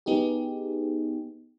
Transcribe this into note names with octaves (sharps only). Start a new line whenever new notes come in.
B3 D#4 G4 G#4